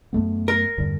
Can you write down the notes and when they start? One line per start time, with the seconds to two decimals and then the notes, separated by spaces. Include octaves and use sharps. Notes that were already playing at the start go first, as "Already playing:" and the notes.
0.13 F#2 A3 B3
0.48 A#4
0.78 E2 G2 D3